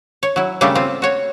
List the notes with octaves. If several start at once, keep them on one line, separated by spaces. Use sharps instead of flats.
C#5
F#3 E4
C#3 G3 A3 A#3 D4 A4
C4 F4
F#4 C#5